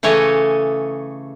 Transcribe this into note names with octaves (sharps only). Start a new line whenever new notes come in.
C#3 E3 A3 C#5 D#5